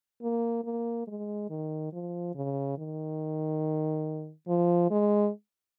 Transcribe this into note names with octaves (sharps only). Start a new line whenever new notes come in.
A#3
A#3
G#3
D#3
F3
C#3
D#3
F3
G#3